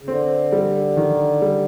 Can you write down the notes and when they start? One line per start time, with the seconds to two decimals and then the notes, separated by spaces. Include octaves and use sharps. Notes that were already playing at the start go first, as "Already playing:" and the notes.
0.02 C#3
0.07 D3 C4
0.52 G3
0.97 D#3
1.42 G3